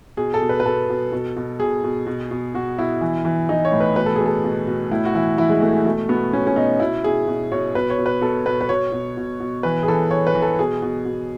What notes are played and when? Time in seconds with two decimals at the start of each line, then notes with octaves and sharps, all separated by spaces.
0.17 B2 G#4
0.34 A4
0.42 B2
0.49 B4
0.60 B4
0.65 B2 A4
0.89 B2
1.12 B2
1.37 B2
1.60 B2 G#4
1.84 B2
2.07 B2
2.31 B2
2.54 B2 F#4
2.79 B2 E4
3.01 E3
3.25 E3
3.49 E3 D#4
3.65 C#5
3.72 A2
3.80 B4
3.96 B2 B4
4.06 A4
4.16 B2 G#4
4.26 A4
4.44 B2
4.67 B2
4.92 A2 E4
5.05 F#4
5.14 E3 E4
5.38 E3 E4
5.49 G#3
5.62 E3 A3
5.73 G#3
5.85 B2 A3
6.09 B2 B3
6.33 B2 C#4
6.47 C#4
6.56 B2 D#4
6.80 B2 E4
7.04 B2 G#4
7.28 B2
7.52 B2 C#5
7.75 B2 B4
7.90 C#5
7.98 B2
8.06 B4
8.21 B2 A4
8.46 B2 B4
8.61 B4
8.69 B2 C#5
8.92 B2
9.17 B2
9.40 B2
9.63 E3 B4
9.83 G#4
9.88 E3 A4
10.11 E3 C#5
10.27 B4
10.35 E3
10.42 A4
10.59 B2 G#4
10.82 B2
11.05 B2